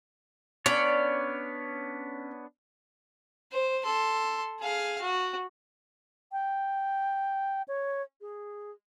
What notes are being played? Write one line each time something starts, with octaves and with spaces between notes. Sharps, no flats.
B3 C#4 D4 C#5 D5
C5
A4 C6
G#4 F5
F#4
G5
C#5
G#4